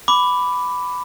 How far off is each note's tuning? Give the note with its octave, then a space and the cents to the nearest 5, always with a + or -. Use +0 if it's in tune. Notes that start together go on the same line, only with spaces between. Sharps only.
B5 +10 D6 -5